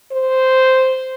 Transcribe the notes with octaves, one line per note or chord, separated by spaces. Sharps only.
C5